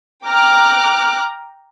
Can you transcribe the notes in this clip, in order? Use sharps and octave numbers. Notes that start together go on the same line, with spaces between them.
G5 A#5 D6 F6 F#6